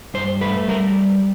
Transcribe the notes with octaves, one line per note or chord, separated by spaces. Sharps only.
G2 C5
A3 B4
G3 A#4